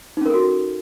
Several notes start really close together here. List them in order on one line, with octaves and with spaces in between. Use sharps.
D#4 C#4 A#4 A4 F#4